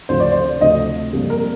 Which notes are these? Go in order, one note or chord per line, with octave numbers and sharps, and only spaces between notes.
D2 C3 F3 C5
D5
C5
D2 C3 F3 A3 D#5
F2 C3 G3 A#3
A#4